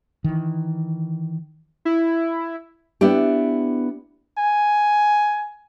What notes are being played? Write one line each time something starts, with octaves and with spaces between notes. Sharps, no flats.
D#3 E3
E4
B3 D4 E4 G4
G#5